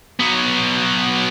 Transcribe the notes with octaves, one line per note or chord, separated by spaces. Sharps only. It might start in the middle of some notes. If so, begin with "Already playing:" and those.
F#3 B3